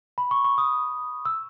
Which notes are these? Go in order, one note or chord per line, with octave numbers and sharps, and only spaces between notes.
B5
C#6
C#6
D#6
E6